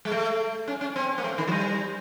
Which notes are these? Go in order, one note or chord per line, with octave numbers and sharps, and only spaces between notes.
G#3
A3
C#4
C#4
C4
A#3
A3
D#3
F#3
G3